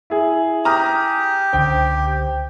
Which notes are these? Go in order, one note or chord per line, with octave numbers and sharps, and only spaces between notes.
E4 G#4
G4 A#5 D#6 F6
C#2 D3 C5 G5